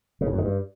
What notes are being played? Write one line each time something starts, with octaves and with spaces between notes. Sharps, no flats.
C#3
A2
F#2
D#3
G2